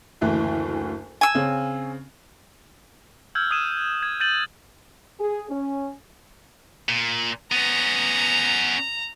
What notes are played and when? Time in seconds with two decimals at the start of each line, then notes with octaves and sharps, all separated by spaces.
0.21 F#1 D2 E3
1.21 G#5 E6
1.35 C#3 C4 C#4
3.35 E6 F6 G6 G#6
3.51 D#6 G#6 D#7 E7
4.03 G#6
4.20 G6 A6 D#7 F#7
5.19 G#4
5.50 C#4
6.89 A#2
7.52 B3 C#4 A#5